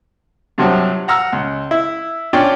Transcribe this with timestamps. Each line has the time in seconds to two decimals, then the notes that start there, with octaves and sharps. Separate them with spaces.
0.58 G2 C3 F3 F#3
1.08 F#5 A#5 E6 F6
1.32 C#2
1.71 E4
2.33 C#4 D4 F4 D5 G5 D6